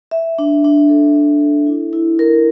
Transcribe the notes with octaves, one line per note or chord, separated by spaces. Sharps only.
E5
D4
D4
A4
E5
A4
E4
E4
A#4